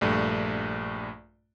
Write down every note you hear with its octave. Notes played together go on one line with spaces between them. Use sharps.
A#1 G2 A3